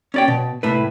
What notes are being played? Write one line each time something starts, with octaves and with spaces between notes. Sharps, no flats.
C#4 D5 G5
B2
C2 A2 B4